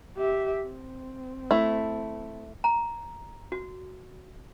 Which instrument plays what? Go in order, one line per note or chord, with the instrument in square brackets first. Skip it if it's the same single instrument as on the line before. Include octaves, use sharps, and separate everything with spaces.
[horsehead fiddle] G4 E5
C4
[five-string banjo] A3 E4
[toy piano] A#5
F#4